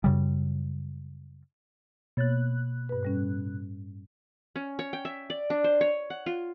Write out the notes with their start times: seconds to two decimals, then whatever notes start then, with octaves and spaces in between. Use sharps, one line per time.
0.04 F#2 C#3 G3
2.17 B2 A#3 C#5 F#6 A6
2.89 G2 B4
3.03 A2 G3 C#4
4.56 C#4
4.79 C#5
4.93 G5
5.05 E5
5.30 D5
5.50 D4
5.64 C5
5.81 C#5
6.10 F#5
6.26 F4